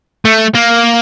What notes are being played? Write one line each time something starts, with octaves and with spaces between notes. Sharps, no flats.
A3
A#3